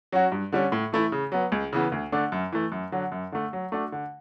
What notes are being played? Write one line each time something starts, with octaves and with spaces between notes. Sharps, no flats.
F#3 C#4 F#4
G2
D3 G3 C#4
A2
E3 A3 E4
C#3
F#3 B3
C#2
C#3 E3 B3
D2
D3 A3 D4
F#2
E3 A3
F#2
D3 F#3
F#2
D3 A3
F#3
A3 D4 F#4
D3